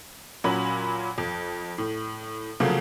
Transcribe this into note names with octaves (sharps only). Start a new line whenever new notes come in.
A#2 F#3 C#4 B5
F2
A2
C#3 F3 F#3 A3 A#3